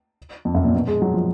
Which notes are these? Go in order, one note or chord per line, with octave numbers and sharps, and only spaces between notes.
F2
F#2
A#2
B2
G#3
F#3
F3